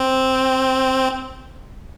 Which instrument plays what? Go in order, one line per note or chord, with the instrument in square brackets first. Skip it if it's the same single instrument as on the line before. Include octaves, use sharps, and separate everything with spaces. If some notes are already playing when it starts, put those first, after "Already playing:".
Already playing: [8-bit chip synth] C4